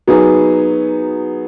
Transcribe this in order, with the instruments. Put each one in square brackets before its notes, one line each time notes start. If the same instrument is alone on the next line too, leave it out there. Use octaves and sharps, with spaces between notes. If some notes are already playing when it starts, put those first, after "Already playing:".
[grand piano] F#3 B3 D#4 G#4